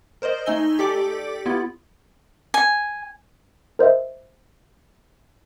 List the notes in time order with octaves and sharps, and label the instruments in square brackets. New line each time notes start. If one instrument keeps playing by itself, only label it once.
[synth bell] A#4 C5 D5 D#5
A3 D#4 D#5 G#5 E6 G7
G4 A4 D5 D6
B3 E4 F4
[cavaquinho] G#5
[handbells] A#4 C5 D#5 E5